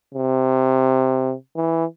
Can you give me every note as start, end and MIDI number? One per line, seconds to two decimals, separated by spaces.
0.14 1.34 48
1.56 1.85 52